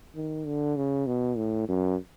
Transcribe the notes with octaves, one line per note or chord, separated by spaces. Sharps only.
D#3
D3
C#3
B2
A2
F#2